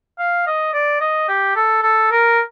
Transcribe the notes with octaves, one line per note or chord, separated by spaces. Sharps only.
F5
D#5
D5
D#5
G4
A4
A4
A#4